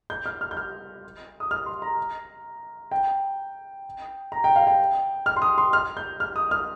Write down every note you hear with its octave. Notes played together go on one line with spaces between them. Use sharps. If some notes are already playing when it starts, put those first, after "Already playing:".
G6
F6
F6
G6
F6
D#6
F6
C6
A#5
G5
A#5
G5
F5
G5
F6
C6
D#6
C6
F6
G6
F6
D#6
F6